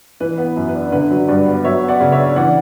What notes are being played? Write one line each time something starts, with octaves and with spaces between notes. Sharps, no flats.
E3 B4
B3
F#2
B4
D4
D3 B4
F#3
G2 B4 D5
B3
F#3 C#5 E5
B3
D5 F#5
C#3
C#5 E5
D4
E3 D5 F#5